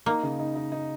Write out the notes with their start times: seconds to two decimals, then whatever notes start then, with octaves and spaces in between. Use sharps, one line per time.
0.06 A#3 D#4
0.23 C#3
0.39 D#4
0.56 D#4
0.72 D#4